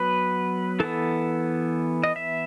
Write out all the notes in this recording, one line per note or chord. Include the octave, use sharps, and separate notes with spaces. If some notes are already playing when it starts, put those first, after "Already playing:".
Already playing: F#3 B3 B4
E3 B3 A4
D#5
E5